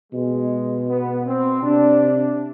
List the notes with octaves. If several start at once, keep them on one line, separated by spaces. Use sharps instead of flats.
B2 G#3
B3
C4
C3 D4